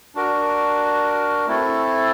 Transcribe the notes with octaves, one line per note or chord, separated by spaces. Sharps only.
D4 F#4 A#4
A3 C4 E4 A4